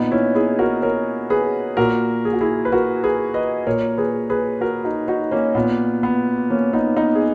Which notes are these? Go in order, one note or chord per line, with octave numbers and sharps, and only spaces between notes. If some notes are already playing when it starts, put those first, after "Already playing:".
Already playing: A#2 B3 D#4
C#4 E4
E4 G#4
F#4 A#4
A#4 C#5
G#4 B4
A#2 F#4 A#4
G#4
F#4
E4 G#4
B4
F#4 A#4
G#4 B4
B4 D#5
A#2 A#4 C#5
G#4 B4
G#4 B4
F#4 A#4
D#4 F#4
D#4 F#4
A#3 C#4
A#2 B3
B3
A#3 C#4
B3 D#4
B3 D#4
G#4